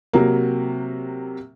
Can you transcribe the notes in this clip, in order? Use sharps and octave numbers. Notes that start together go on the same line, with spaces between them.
C3 F#3 A#3